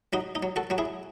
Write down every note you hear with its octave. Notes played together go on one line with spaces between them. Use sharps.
F#3 D#4 F#4
D#4
F#3
F#4 A4
F#3 F#4
E4 G#4